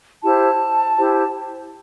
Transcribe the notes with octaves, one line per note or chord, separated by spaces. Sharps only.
E4 G4 C5 A5
E4 G4 C5